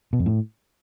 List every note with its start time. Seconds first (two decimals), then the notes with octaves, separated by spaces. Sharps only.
0.13 B2
0.19 F2
0.26 A2